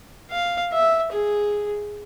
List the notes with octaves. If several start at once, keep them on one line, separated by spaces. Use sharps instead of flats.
F5
E5
G#4